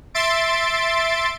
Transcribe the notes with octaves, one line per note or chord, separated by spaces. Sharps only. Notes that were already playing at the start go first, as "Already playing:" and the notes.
E5 C6 A6 D7